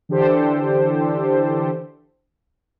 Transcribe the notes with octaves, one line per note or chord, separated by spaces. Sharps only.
D3 E3 D4 G4 A4 C5